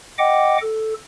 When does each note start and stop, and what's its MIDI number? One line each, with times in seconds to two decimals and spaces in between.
0.18 0.58 75
0.18 0.58 78
0.18 0.58 79
0.18 0.58 86
0.62 0.94 69